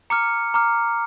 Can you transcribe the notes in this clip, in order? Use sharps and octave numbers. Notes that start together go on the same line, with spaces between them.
A#5 D6 F6 C#7
A#5 D6 F6